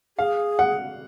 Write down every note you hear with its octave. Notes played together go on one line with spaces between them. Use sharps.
G#4 F5
F#5